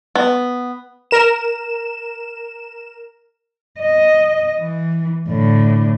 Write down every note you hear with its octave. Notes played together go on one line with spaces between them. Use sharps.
B3
A#4 E7
D#5
E3
A2 D3